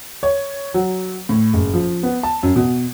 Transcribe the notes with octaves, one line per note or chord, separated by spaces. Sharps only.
C#5
F#3
A2
F#1
F3
B3
A5
F#2
B2